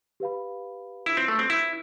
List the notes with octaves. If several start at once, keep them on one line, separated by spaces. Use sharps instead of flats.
G4 B4 F5 B5
D4 E4 F4 B4
C4
A3
C4
E4